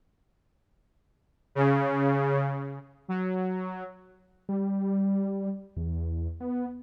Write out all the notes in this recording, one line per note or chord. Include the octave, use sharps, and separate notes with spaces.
C#3
F#3
G3
E2
B3